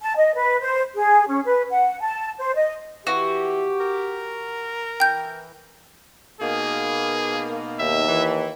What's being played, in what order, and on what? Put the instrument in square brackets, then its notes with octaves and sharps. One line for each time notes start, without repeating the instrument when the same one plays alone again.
[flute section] A5
D#5
B4
C5
G#4
C#4
B4
F#5
A5
C5
D#5
[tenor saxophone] E3 [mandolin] F#4 [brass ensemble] G4
[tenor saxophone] A#4
[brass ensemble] E3 [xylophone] G5 G6
[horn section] B2 A#3 D#4 [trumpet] G#4
[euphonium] D#2 [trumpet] E5
[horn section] E3